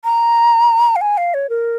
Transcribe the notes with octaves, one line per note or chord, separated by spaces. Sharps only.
A#5
F5
G#5
F5
C#5
A#4